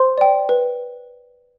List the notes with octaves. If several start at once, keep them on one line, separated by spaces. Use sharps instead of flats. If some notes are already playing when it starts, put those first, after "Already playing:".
Already playing: C5 C6
D5 G5
B4